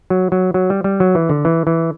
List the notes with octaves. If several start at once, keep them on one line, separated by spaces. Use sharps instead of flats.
F#3
F#3
F#3
G3
G3
F#3
E3
D3
E3
E3